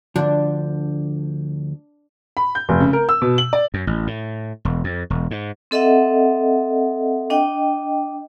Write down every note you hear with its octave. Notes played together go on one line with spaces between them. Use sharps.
D2 D3 F3 D4
B5
G6
F1
C#3
A#4
E6
B2
F#7
D5
F#2
A1
A2
E1
F2
E1
G#2
C4 A4 D#5 E5 F#5
D4 D#5 G5